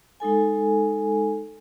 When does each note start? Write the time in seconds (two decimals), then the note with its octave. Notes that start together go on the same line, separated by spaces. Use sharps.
0.20 G#3 D#4 A4 G#5